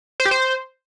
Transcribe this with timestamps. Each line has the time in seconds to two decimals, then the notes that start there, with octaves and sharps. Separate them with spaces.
0.20 C5
0.25 G4
0.31 C5